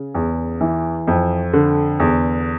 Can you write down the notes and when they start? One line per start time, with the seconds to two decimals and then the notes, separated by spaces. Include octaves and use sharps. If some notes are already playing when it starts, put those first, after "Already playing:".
Already playing: C#3
0.15 E2
0.61 E3
1.07 F2
1.53 D3
2.00 E2